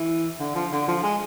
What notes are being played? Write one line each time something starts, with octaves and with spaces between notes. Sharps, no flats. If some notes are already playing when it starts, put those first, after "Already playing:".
Already playing: E3
D3
F3
D3
F3
G#3